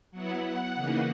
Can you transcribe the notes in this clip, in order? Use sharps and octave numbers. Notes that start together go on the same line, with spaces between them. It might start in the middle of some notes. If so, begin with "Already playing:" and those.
F#3 B3 E4 F#5
F#5
C#3 E3 A#3 D#4